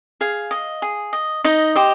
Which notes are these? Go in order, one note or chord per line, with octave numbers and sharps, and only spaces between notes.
G#4 F5
D#5
G#4
D#5
D#4 D#5
G4 C5 D#5